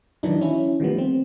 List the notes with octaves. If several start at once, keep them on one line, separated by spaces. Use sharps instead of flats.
D#3 E3 F#3 D4 D#4
C#4 E4
D#3 F3 G3 A3 B3
C4